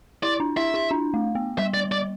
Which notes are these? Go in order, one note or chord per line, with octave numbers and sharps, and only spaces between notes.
E4 D5
D4
E4 E5
E4
D4
A3
B3
G3 E5
D5
D5